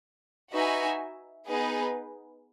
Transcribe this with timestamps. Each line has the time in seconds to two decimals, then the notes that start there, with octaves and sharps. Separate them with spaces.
0.53 D#4 F#4 B4 E5 G#5
1.48 B3 D#4 G#4 B4